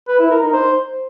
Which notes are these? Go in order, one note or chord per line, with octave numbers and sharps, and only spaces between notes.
B4
E4
A#4
D#4
C5